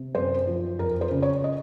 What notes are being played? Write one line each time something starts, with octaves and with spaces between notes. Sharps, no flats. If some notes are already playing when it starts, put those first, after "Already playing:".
Already playing: C3
F#2 C5
F3
F2 A#4
C5
C#3
C#5
D#5